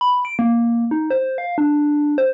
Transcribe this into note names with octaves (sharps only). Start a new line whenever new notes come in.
B5
D7
A#3
D#4
C5
F5
D4
C5